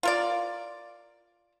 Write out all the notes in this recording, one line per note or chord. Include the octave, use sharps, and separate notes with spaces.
F4 A#4 D5